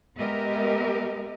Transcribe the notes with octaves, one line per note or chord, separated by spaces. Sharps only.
G#3 B3 G4 A#4 D#5 E5